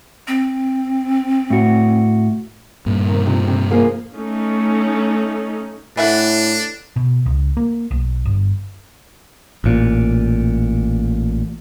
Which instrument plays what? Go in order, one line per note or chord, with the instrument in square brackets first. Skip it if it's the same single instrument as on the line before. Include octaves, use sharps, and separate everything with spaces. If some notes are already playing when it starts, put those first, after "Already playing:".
[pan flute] C4
[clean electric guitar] A2 F#4
[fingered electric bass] G2 A#2
[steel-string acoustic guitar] C3 D#3
C3 F3 D#4
C3
F3 A#3 G#4
[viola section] A3 C#4 D#4
[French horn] A2 [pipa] E3 E5 F#5 [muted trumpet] D4
[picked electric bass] B2
C#2
A#3
B1
G1
A1 A#2